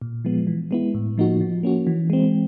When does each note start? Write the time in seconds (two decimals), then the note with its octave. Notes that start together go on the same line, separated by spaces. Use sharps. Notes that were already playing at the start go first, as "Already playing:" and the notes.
0.02 A#2
0.25 F3 G#3 B3
0.47 E3
0.71 G#3 B3 E4
0.94 A2
1.18 F3 A#3 D#4 F#4
1.41 F3
1.63 A#3 C#4 F#4
1.87 E3
2.10 G#3 C4